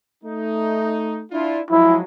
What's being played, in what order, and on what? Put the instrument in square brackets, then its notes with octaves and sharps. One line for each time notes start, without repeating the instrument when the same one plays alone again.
[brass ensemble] A3 D#4
D4 E4 F4
[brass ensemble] F3 F#3 G#3 [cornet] E4